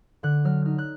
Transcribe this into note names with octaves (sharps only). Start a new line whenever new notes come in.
D3 F#6
F#3 F6
D#4 F6
F#6